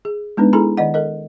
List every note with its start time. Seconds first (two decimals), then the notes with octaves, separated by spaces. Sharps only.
0.05 G#4
0.37 G#3 B3 D4 D#4 B4
0.53 E4 G#4 A4 G#5 A#5 B5
0.77 D#3 D5 D#5 F#5
0.94 A4 A#4 D#5